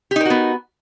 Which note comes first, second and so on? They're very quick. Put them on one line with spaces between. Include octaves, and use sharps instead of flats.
G4 D#4 A#4 F#4 B3